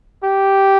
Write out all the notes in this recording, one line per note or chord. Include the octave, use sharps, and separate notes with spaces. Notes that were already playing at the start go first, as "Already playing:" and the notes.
G4